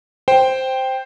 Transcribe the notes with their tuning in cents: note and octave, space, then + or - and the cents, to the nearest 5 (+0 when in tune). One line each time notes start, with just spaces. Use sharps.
C5 +0 G5 +0